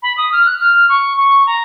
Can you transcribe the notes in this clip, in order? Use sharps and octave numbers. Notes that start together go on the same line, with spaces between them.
B5
D#6
F6
F#6
F6
C#6
C#6
A#5